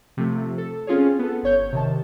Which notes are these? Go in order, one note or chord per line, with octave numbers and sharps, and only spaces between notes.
C3 F3 A3
A4
C4 C#4 F4 G#4 C#5
B3 A4
G1 C#5 G6
C3 D#3 A5